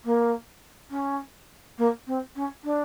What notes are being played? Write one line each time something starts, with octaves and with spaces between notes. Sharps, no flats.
A#3
C#4
A#3
C4
C#4
D4